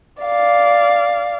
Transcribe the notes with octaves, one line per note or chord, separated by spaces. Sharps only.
D5 F5